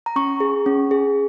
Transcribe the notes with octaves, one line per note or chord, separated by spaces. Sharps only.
A#5
C#4 C#6
G#4
C#4
G#4